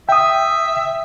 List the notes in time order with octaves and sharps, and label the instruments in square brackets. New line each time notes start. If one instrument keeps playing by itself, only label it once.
[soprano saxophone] E5 [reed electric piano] G5 D#6